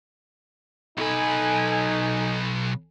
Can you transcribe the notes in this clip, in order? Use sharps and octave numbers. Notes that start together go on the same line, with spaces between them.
B1 D#4 A4 B4 G#5